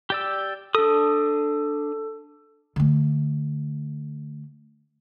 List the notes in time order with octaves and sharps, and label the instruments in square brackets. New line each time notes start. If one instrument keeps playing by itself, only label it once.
[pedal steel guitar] G4 D5 E6
[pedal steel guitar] D4 D#6 [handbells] A4
[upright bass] D3 A3